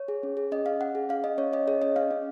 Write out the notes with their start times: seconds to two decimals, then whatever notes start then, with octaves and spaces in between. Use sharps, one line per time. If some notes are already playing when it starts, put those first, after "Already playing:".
Already playing: C#5
0.08 G#4
0.23 C#4
0.37 G#4
0.52 C#4 D#5
0.66 C#4 F5
0.81 C#4 F#5
0.95 G#4
1.09 C#4 F5
1.24 C#4 D#5
1.38 C#4 C#5
1.53 C#4 D#5
1.68 G#4 C#5
1.82 C#4 D#5
1.96 C#4 F5
2.11 C#4